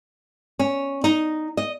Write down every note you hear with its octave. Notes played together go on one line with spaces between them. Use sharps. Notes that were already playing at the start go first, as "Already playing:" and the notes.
C#4
D#4
D#5